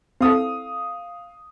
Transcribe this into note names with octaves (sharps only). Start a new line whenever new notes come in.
C4 E4 A4 F5 D#6